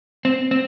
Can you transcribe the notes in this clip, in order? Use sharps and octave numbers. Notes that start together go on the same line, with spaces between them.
C4
C4